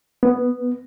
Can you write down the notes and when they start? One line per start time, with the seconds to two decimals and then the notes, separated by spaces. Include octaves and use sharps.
0.23 B3